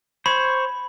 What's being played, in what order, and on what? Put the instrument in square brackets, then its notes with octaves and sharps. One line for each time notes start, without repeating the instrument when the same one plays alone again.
[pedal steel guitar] C5 C#5 [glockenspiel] B5